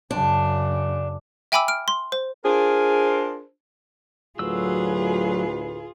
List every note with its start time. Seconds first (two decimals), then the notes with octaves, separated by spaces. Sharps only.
0.11 F#2 C#3 D4
1.52 E5 G5 G#5 B5 D6 E6
1.68 F6 D7
1.88 C6
2.12 C5
2.45 D4 F4 G#4 A#4 C5
4.39 D2 A2 F#3 F4 G#4 B4 E6